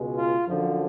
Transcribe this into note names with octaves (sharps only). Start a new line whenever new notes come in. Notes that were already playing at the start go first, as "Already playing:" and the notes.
Already playing: C#2 B2 G#3
F4
F#2 D3 F3